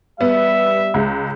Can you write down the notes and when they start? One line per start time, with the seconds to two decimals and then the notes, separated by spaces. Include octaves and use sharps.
0.21 G3 B3 E5
0.94 C#2 G#3